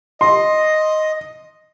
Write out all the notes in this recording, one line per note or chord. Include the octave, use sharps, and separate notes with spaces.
D#5 C6